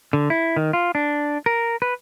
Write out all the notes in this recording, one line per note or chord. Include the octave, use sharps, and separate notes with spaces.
D3
E4
D#3
F4
D4
A#4
B4